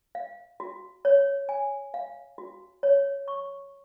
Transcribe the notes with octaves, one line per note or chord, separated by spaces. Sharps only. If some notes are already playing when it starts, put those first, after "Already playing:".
F5
F#4
C#5
G#5
F5
F#4
C#5
C#6